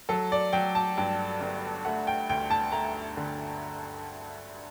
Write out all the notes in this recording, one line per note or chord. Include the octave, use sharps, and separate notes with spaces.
F#3 A4
D5
F#3 G5
A5
G2 G5
G1
A3 F#5
G5
D2 G5
A5
A3 A#5
D3